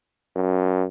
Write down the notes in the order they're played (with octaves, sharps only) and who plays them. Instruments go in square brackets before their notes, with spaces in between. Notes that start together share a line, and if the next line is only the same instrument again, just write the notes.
[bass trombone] F#2